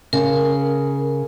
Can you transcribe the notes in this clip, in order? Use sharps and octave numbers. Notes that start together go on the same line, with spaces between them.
C#3 A#4